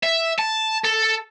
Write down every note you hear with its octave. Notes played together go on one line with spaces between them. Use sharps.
E5
A5
A4